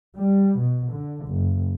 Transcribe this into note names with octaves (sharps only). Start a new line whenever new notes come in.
G3
B2
D3
F#1